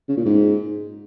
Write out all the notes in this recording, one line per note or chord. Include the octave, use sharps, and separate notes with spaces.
C#3
A#2
G#2